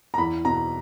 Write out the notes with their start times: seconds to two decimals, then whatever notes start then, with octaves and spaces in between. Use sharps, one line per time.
0.14 A#5
0.18 E2 B5
0.45 B2 A#5